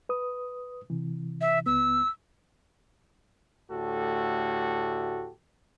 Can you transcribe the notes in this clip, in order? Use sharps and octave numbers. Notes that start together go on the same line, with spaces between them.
B4 D#6
C3 E3
E5
C#2 B3 E6
D2 A2 F#4 G4 A4